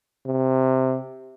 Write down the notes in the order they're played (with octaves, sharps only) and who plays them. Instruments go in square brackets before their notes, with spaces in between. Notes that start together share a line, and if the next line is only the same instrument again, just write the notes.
[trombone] C3